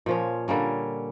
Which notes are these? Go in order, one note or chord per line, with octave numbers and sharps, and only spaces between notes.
A#2 F3 C#4
D3 G3 A#3 C#4